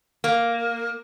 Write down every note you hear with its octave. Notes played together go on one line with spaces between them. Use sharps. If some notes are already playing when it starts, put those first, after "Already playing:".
A#3